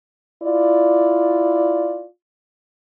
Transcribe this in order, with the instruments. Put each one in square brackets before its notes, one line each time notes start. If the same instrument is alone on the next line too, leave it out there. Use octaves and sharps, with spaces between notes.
[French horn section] E4 F4 D5